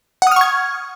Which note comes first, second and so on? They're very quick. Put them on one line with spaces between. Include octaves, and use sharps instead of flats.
F#5 D#6 F6 C#6 G#6